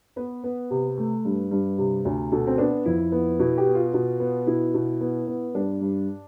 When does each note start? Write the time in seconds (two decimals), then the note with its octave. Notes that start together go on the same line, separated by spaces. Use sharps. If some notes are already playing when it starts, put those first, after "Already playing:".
0.16 B3 B4
0.44 B3
0.70 C3
0.98 A3
1.25 G2
1.51 G2
1.78 C3
2.05 D2
2.32 B2 A4
2.47 C4
2.58 B3 D4
2.85 F2 E4
3.12 B3
3.39 B2 E4
3.57 G4
3.66 B3
3.75 F4
3.94 B2
4.19 B3
4.47 B2 E4
4.74 B2
5.01 B3
5.27 B3
5.55 G2 D4
5.81 G2